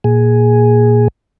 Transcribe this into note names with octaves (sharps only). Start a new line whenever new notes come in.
A#2 G#4